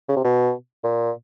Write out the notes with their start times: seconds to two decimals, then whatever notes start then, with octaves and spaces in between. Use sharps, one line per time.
0.09 C#3
0.16 C3
0.24 B2
0.84 A#2